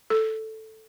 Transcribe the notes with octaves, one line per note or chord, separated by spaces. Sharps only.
A4